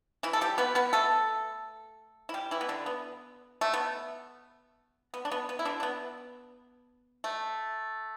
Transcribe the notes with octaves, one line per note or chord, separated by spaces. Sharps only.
E3 E4
A4
G3 G4
B3 B4
B3 B4
A3 A4
E4
G3 G4
E3 E4
B3
D3 D4
B3
A3
B3
B3
D4
B3
B3
E4
D3 D4
D4
B3
A3